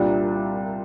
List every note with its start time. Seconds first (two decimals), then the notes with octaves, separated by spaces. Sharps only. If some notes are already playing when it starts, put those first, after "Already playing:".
Already playing: C2 A#2 G3 D4 F4